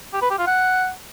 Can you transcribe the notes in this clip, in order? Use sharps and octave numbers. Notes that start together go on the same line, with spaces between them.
G4
B4
G4
F4
F#5